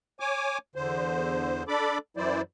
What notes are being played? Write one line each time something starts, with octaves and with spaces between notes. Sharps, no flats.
C#5 G#5 D6
E2 D3 C5
D4 A4 D5 B5 D6
F#2 E3 F#3 E4 C5 D5